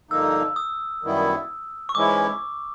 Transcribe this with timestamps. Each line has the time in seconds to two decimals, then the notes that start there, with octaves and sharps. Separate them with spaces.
0.11 G2 D3 F3 A#3 D#4 E6
0.56 D#6
1.03 F#2 D#3 G3 B3 E4
1.89 C#6
1.94 G#2 E3 G#3 C#4 E4 D6